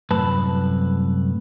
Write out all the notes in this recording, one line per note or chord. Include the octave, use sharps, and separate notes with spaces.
C2 F#2 A2 B4 A5